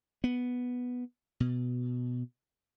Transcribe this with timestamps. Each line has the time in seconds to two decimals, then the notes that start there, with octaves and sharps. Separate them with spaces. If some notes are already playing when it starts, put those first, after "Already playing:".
0.24 B3
1.40 B2